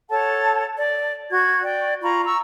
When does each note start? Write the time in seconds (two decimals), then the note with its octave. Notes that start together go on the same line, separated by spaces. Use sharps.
0.10 A4 C#5 F#5 A5
0.77 D5
1.31 F#4 G#6
1.63 D5 G5
2.02 F4 A#5 B5 C#6
2.25 A#5 C#6 E6